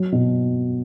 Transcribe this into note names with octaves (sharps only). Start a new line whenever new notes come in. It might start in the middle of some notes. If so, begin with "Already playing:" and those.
Already playing: F#3
B2